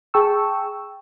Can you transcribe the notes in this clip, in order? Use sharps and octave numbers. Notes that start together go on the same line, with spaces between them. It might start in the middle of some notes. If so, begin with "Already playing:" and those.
G#4 G5 A5 C#6 E6